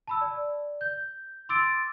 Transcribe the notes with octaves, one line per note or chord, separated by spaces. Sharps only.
A5 B5 E6
D5
G6
C6 D6 E6 A6 D7